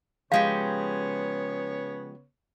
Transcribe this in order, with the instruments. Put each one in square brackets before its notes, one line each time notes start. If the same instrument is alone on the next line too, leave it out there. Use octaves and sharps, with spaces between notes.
[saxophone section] C#3 B3 C#5 [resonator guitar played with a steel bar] F3 G#3 G4 [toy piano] F5